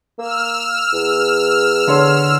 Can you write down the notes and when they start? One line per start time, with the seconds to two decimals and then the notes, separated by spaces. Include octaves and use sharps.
0.18 A#3 E6 F6
0.93 E2
1.87 D3 C#5 C6